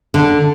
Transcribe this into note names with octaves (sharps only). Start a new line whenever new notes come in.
D3